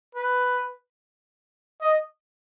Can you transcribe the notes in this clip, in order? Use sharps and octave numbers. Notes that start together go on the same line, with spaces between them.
B4
D#5